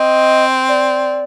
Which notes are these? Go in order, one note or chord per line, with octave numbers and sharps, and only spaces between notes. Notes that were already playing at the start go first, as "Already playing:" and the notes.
Already playing: C4 D#5
D5